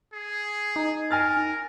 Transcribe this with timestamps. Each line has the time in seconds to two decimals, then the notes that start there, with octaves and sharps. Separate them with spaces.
0.13 G#4
0.76 D#4
1.11 A#4 G#5 F6 A6